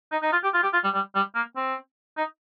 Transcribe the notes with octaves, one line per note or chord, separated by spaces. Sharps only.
D#4
D#4
F4
G4
F4
G4
F4
G3
G3
G3
A#3
C4
D#4